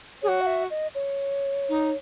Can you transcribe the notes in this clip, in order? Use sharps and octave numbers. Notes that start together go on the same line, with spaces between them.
G#4 C#5
F#4
F#5
E5
D#5
C#5
D#4